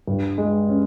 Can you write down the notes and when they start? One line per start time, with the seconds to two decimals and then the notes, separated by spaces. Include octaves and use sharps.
0.07 G2
0.38 G#3
0.69 C#4